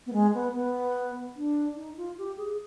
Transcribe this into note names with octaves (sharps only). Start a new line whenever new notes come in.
B3
G#3
B3
B3
D4
D#4
F4
G4
G#4